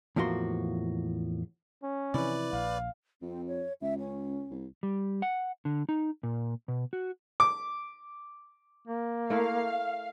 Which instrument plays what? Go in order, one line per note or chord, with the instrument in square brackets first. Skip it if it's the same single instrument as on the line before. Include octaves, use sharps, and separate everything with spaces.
[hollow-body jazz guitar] E2 A2 F3 A#3 F#4 C6
[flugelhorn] C#4
[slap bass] C3 E3 F3 [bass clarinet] E4 [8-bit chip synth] B4 D5
[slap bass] A#1 [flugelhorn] F5
[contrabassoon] F2 [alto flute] C4
[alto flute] C#5
[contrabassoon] C#2 [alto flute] E5
[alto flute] C#4
[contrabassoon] C2
[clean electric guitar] G3
F#5
D3
D#4
A#2
B2
F#4
[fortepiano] D6
[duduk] A#3
[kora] A3 E4 A#4 [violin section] F5